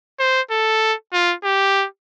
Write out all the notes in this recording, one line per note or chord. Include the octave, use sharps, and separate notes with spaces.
C5
A4
F4
G4